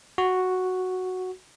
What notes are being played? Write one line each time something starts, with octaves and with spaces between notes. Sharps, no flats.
F#4